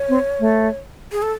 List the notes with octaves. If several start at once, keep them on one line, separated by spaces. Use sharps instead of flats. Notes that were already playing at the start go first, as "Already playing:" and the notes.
Already playing: C#5
C4
A3
G#4
A4